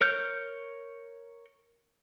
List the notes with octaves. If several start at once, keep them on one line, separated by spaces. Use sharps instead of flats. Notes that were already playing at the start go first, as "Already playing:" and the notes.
A#4 C#5 F6 G6